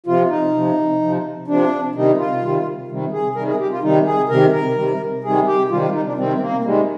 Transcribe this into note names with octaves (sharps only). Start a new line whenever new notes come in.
C3 F3 F4
D#4
C3 F3
C3 F3
C3 F3 D4
C3 D#3 G3 D#4
F4
C3 D#3 G3
C3 D#3 G3
G#4
C3 D#3 G3 A#4
G#4
G4
F4
C3 D#3 G3 D#4
G#4
C3 D#3 G3 A#4
A#4
C3 D#3 G3
C3 D#3 G3 G#4
G4
C3 D#3 G3 F4
F4
D#4
D4
C3 D#3 G3 C4
C4
A#3
C3 D#3 G3 G#3